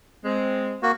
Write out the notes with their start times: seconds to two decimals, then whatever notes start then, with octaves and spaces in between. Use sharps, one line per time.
0.25 G#3 C4
0.83 A#3 F#4